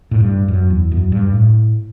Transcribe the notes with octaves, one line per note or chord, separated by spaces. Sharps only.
A2
G2
F#2
E2
F#2
G2
A2